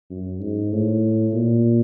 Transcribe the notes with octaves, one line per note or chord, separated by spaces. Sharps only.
F#2
G#2
A2
A#2